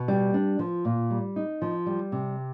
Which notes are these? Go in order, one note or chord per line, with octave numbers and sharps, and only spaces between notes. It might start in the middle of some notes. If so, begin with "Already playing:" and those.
Already playing: B2
G3
D4
F3
A#2
G3
D#4
F3
G3
C3